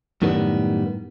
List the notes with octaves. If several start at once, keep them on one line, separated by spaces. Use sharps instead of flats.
F#2 A2 D#3 G3 B3